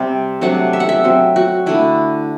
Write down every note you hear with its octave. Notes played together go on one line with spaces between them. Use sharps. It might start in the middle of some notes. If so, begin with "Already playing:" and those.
Already playing: C3 G3 C4
C3 F#3 A3 D4 F#5
E5
F#5
E5
F#3 C4
F#4
D3 A3 D4 E4